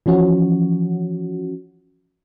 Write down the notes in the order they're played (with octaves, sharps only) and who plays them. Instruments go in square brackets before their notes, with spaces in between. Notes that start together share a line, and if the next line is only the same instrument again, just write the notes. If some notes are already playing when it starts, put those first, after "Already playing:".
[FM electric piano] E3 F3 C#4 F#4